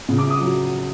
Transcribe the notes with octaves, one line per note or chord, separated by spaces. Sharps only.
C#3
D6
D#6
F#3